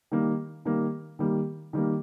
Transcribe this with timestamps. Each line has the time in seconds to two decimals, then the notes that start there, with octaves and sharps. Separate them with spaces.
0.12 D#3 G3 A#3
0.65 D#3 G3 A#3
1.19 D#3 G3 A#3
1.73 D#3 G3 A#3